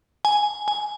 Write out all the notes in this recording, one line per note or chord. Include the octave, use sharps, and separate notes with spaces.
G#5
G#5